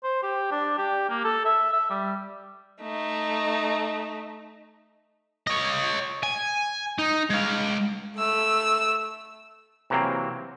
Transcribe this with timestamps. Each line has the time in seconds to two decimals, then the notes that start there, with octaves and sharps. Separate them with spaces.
0.04 C5
0.23 G4
0.51 D4
0.78 G4
1.09 A#3
1.24 A4
1.45 E5
1.72 E5
1.90 G3
2.82 A3 D#4
5.47 C#5 D#5
6.23 G#5
6.99 D#4
7.30 G#3 F5
8.17 A3 E6
9.90 C3 E3 F#3 A#3 C4